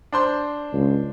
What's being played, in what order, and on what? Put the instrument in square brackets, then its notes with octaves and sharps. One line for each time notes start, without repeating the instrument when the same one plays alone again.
[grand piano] D4 C5 C6
[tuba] C#2